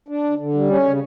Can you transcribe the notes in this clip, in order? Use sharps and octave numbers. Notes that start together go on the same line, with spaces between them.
D4
D3
D3
G3
C#4
C#3